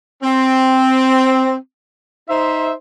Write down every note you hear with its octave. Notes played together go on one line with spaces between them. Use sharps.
C4
D#4 C5 E5